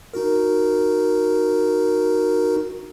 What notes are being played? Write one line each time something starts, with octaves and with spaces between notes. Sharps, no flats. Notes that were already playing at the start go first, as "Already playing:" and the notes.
D#4 F#4 A#4